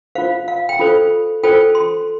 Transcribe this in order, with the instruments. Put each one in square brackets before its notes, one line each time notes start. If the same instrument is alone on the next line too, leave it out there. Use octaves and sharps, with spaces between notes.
[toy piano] F4 C5 F5
F5
G5
F4 A4 C5
F4 A4 C5 G5
C6